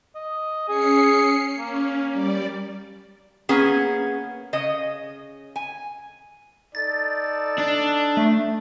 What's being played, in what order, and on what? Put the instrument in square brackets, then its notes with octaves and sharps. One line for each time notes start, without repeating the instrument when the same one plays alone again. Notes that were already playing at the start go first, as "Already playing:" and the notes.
[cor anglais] D#5
[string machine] C#4 C7 C#7 [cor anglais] G#4
[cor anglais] A#3 [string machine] C#4
[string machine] G3 D5
[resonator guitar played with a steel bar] A#3 B3 C#4 G#4
C#3 D#5
G#5
[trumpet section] D#4 A4 D5 [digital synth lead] A6
[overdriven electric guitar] D4
[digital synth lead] A3